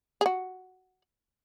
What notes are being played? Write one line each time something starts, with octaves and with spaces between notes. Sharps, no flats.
G#4
F#4